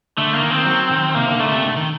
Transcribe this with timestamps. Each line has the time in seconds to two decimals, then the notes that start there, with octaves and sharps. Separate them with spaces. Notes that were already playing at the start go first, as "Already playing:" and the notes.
0.18 D3 A3
0.34 A#3
0.42 D#3
0.51 C4
0.66 F#3
0.91 D#3
1.15 C3 A#3
1.28 D3
1.39 D3 A3
1.52 C3
1.64 D3
1.76 D#3